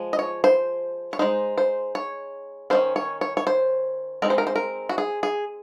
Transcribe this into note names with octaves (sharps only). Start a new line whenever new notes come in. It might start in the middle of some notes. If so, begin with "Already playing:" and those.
Already playing: F3 G#3
D#5
C#5
C5
C#5
G#3 D#4 C5
C5
C#5
D#3 G#3 C#4 C5
C#5
C#5
C#5
C5
G#3 C4 D#4 A#4
C5
A#4
C5
A#4
F#4
G#4
G#4